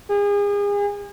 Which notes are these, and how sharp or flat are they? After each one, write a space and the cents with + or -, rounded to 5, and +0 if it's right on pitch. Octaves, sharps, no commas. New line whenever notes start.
G#4 -35